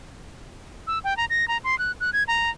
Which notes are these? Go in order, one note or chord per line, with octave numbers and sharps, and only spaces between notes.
E6
G5
A#5
A#6
A#5
C6
F#6
F#6
G#6
A#5